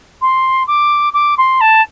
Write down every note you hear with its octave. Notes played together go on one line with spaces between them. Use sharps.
C6
D6
D6
C6
A5